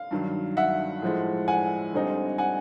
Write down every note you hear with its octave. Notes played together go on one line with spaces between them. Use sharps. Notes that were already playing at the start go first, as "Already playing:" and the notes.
Already playing: F5
G2 D#3 F#3
E5 F#5
A2 F3 G#3
F#5 G#5
D2 D3 G3 C4 D#4
F#5 G#5